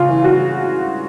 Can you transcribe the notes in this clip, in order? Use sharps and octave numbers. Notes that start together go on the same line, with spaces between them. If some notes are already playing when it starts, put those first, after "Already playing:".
Already playing: C#3 F4
E3
F#4